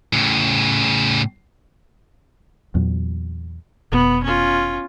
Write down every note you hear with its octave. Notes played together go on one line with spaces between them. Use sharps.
A2 C#3
E2 A#2 F#3
F1 B2 B3
C#4 F4